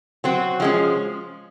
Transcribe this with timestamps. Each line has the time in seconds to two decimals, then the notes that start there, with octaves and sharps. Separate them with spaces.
0.24 F#3 C4 F#4
0.60 F3 G#3 C#4